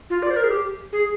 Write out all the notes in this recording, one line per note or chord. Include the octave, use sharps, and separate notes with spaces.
F4
D5
C5
A#4
G#4
G4
G#4